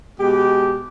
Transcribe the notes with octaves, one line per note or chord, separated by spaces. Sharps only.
B2 G#3 G4